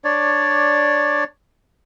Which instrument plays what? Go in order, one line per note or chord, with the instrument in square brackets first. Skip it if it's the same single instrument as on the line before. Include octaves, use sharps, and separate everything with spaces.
[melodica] D4 C#5 D5